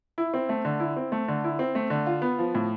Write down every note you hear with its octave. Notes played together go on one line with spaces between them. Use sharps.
E4
C4
A3
D3
E4
C4
A3
D3
E4
C4
A3
D3
F4
B3
F3
A2